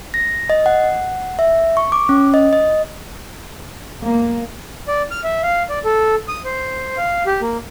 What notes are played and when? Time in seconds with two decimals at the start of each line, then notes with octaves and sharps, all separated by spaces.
0.14 A#6
0.50 D#5
0.66 F#5
1.39 E5
1.77 C#6
1.92 D6
2.09 C#4
2.34 D#5
2.53 D#5
4.02 A#3
4.88 D5
5.11 F6
5.24 E5
5.43 F5
5.69 D5
5.85 A4
6.28 D#6
6.45 C5
6.98 F5
7.27 G4
7.41 A#3